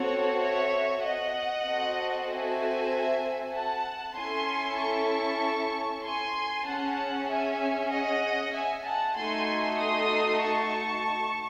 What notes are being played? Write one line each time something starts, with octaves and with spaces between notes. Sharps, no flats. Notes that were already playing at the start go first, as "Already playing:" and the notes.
Already playing: C4 F#4 A4 C#5
C#5 E5
D#5 F#5
C4 F#4 A4
E5 G#5
F#5 A5
C#4 E4 A4 G#5 C6
A5 C#6
G#5 C6
C#4 G#4 F#5 A5
E5 G#5
D#5 F#5
E5 G#5
F#5 A5
A3 D#4 F#4 G#5 C6
C6 D#6
A5 C#6